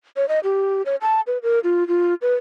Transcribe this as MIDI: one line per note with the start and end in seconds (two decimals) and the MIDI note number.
0.17 0.28 73
0.29 0.39 75
0.44 0.82 67
0.86 0.96 73
1.02 1.21 81
1.27 1.38 71
1.43 1.59 70
1.64 1.87 65
1.88 2.14 65
2.22 2.34 71